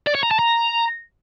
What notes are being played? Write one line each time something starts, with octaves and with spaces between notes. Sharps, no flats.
D5
C#5
A#5
A5
A#5